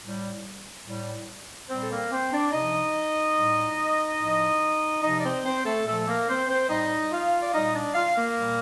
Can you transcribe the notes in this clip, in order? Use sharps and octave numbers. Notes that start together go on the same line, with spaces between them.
A2 G3
A2 G3
A#2 G3 C4 C5
A4
A#3 A#4
C4 C5
D4 D5
C3 F3 D#4 D#5
A2 G3
A2 F3
C3 F3 D#4 D#5
D5
C4 C5
C4 C5
A3 A4
A#2 F3 A3 A4
A#3 A#4
C4 C5
C4 C5
A2 G3 D#4 D#5
F4 F5
D5
A#2 G3 D#4 D#5
D4 D5
F4 F5
A#3 A#4
A#2 G3